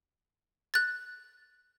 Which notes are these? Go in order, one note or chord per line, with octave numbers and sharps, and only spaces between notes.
F#6 A6